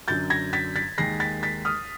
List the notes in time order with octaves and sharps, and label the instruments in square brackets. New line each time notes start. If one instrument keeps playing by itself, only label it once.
[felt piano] F#2 D3 F#3 G6 A6
G#6 A#6
A6 B6
A6 B6
D#2 D#3 G#3 A#6 C7
A6 B6
A6 B6
D#6 F6